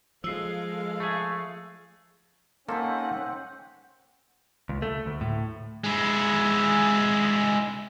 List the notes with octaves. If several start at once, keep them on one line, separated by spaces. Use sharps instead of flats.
F3 G#3 A4 F5 E6 C7
A3 G#4
A#3 C4 C#4 D#4 G4 A4 F#5
C#2
A3
D2
A2
G#3 E4